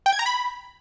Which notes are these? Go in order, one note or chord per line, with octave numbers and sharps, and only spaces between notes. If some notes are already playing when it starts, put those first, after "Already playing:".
G5
G#6
A#5
B5